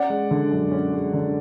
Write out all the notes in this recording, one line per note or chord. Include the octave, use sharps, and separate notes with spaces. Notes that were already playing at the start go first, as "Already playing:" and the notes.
Already playing: C#4 D5 F#5
G#3
D3
F#2
C#4
G#3
D3